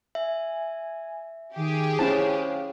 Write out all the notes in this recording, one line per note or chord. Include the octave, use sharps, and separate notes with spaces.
E5 G#5
D#3 G4 G#4
C#4 E4 C5 C#5 F5 A5